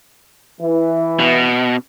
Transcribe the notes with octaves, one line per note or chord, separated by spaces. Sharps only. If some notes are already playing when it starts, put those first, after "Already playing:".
E3
B2